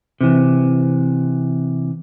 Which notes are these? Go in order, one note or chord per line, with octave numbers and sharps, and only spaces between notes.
C3 E3